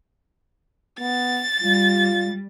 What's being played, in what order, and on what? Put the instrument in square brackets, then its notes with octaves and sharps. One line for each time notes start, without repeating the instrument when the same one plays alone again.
[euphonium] B3 [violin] A6
[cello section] G3 [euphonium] F4